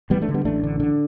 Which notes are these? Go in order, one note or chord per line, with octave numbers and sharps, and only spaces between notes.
A1 G3 B3
A3 D4
D3
G3 B3
A1 A3 D4
D3
D3